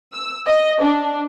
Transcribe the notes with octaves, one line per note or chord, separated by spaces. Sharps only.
E6
D#5
D4